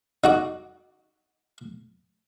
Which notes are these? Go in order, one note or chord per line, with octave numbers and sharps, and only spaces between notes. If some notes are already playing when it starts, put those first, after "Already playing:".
D#4 F#4 D6